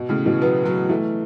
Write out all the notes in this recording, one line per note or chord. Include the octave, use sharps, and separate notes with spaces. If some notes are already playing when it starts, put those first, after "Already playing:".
Already playing: B2
A2 C#3
B2 E3
F#3 B3
F#3 B3
E3 A3